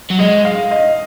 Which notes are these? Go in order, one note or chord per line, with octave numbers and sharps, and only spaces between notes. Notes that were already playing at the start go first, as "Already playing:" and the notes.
F#3
G#3 D#5
F5
D#5